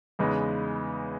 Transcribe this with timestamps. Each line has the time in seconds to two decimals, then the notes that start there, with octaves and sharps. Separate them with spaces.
0.19 E2 C#3 G#3 B3 D#4